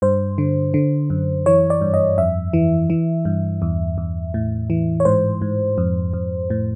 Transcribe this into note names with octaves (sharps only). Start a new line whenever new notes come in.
G2 C5
D3
D3
F#2
E3 C#5
D5
G2
D#5
F2 E5
E3
E3
G2
E2
E2
A2
E3
C#5
G#2 C5
G#2
F2
F2
A2